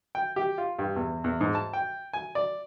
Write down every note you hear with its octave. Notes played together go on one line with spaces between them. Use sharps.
G5
G4
F4
G2
E2
E2
G#2
A5
G5
G#5
D5